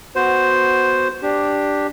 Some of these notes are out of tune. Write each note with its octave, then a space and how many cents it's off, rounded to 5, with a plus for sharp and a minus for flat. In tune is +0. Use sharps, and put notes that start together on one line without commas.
B3 +0 F#4 +0 C5 +0
D4 +0 G4 +0